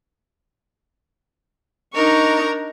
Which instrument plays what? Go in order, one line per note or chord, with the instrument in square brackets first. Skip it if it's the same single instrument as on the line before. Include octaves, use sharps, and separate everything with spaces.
[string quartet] D4 A#4 A#5 [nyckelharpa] D#4 C#6